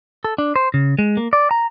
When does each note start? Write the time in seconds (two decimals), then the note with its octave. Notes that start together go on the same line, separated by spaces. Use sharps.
0.25 A4
0.38 D4
0.56 C5
0.74 C#3
0.99 G#3
1.17 A#3
1.33 D5
1.51 A#5